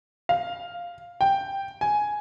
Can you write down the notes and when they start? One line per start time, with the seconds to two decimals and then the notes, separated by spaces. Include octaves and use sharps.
0.29 F5
1.21 G5
1.81 G#5